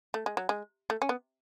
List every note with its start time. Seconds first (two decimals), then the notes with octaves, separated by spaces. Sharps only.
0.14 A3
0.26 G#3
0.37 F#3
0.49 G#3
0.90 A3
1.02 C#4
1.09 B3